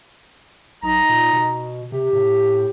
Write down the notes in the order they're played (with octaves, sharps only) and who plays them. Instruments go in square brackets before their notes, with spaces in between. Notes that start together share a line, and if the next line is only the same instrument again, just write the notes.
[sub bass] B1 [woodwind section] D#4 A#5
[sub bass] A#2
B2
[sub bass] C3 [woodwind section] G4
[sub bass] A2